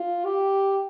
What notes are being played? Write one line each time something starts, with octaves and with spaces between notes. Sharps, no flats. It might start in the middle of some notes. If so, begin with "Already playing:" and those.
Already playing: F4
G4